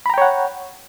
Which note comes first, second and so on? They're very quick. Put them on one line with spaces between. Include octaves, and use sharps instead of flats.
B5 A#5 G5 C#5 F#5